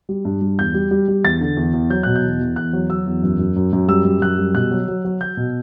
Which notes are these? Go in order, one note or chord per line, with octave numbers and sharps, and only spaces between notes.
G3
G2
G3
E2 G6
G3
G3
G3
E2 A6
D3
E2
E2
F#3 G6
B2 F#6
G6
E2
E2
E2 F#6
F#3
F#3 E6
E2
F#2
F#2
F#2
F#2
G3 E6
F#2
F#2 F#6
G3
B2 F#6
F#3
F#3
F#3
F#3 G6
B2